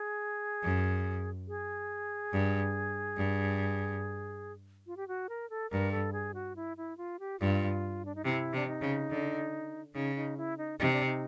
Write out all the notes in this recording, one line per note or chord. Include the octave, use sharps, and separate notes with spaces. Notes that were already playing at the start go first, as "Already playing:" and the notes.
Already playing: G#4
F#2
G#4
G2
G2
F4
G4
F#4
A#4
A4
G2 A#4
A4
G#4
F#4
E4
E4
F4
G4
G2 F4
D4
D#4
C3 E4
C3 D4
D#4
C#3
D3
C#3 D#4
D#4
E4
D#4
C3 D#4
D4
D#4